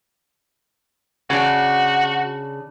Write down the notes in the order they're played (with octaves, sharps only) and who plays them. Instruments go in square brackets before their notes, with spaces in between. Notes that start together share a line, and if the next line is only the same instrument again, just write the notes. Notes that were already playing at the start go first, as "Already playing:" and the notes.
[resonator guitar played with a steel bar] C#3 D4 [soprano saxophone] F#4